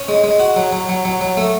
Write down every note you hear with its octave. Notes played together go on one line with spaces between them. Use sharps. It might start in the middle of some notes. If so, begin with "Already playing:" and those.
Already playing: C#4
G#3
G#3
F#4
F#3
F#3
F#3
F#3
F#3
A3